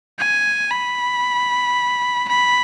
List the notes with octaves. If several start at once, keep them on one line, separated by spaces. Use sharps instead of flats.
G#5
B5
B5